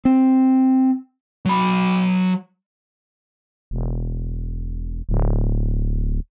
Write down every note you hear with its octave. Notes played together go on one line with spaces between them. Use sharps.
C4
F#3 B5
E1
D1